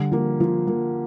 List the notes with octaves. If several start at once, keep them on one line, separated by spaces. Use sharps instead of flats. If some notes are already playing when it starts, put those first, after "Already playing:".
Already playing: D3 G3
F3 A#3
F3
F3 A#3